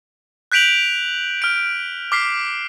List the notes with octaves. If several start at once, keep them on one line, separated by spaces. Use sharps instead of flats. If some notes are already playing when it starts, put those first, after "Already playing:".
F#6 G6 B6 D7 F7 F#7
F6 D7
D6 F6 B6 C7